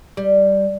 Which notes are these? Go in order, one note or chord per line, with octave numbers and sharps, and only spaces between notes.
G3